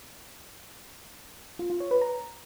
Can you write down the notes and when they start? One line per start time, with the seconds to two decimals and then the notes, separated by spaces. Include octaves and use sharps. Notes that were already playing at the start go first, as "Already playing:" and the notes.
1.59 F4
1.70 F4
1.80 C#5
1.91 B4
2.01 A#5